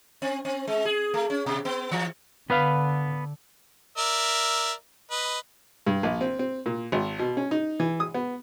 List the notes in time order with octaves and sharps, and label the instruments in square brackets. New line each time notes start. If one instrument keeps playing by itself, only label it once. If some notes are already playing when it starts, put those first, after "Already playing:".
[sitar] C4
C4
G#3
G#4
A3
C#4
B2
B3
E3
[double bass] D3 [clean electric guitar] B3 B4 F5
[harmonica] A#4 D5 E5
B4 D#5
[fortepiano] G2
A#1
C4
C4
A#2
G#1
B2
C#4
D#4
E3
D#6
B3